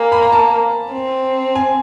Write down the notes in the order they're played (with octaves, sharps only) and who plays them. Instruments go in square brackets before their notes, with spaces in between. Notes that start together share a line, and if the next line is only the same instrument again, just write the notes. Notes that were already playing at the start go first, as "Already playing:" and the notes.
Already playing: [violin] A#3 [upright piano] G#5
[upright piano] B5
A#5
A5
[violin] C4
[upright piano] G#5